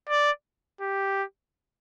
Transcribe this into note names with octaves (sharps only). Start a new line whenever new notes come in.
D5
G4